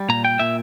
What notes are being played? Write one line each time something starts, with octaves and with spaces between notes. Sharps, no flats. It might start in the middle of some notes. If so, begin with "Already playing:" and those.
Already playing: G3
A#2 A#5
G5
A#2 E5